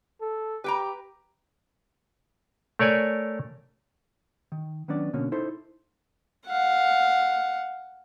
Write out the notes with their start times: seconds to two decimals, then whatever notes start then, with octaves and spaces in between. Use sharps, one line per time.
0.21 A4
0.64 G4 B4 G5 A#5
2.79 A3 A#4 C#5 D5 G#5
4.52 D#3
4.88 D#3 F#3 B3 C#4 D4 D5
5.13 B2 D3 A#3 C#4
5.32 D#4 E4 A4 C5
6.46 F5 F#5